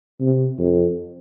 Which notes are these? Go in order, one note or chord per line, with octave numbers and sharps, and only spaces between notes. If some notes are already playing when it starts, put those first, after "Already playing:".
C3
F2